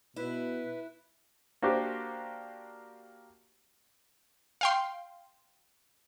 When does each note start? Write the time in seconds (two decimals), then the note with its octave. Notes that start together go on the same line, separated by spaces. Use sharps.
0.16 B2 E4 B4
1.62 A#3 D4 F#4 G4 C5
4.61 F5 G5 C6